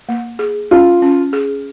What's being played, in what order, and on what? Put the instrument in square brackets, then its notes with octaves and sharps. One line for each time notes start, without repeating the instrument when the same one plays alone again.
[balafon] A#3
G#4
[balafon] C#4 [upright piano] F4
[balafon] C#4
G#4